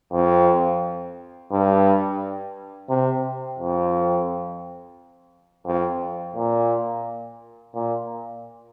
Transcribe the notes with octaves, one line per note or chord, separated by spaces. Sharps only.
F2
G2
C3
F2
F2
A#2
A#2